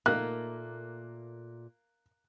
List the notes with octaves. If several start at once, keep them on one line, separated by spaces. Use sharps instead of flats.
A#2 D#3 A3 A#3 F#6